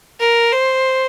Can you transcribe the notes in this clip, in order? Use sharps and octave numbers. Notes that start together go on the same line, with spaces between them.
A#4
C5